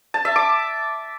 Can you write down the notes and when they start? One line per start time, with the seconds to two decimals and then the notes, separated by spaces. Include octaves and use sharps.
0.14 A5
0.25 E5
0.36 D6